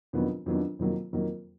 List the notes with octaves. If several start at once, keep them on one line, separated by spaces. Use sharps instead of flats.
F2 D#3 F#3 B3 D4
F2 D#3 F#3 B3 D4
F2 D#3 F#3 A#3
F2 D#3 F#3 A#3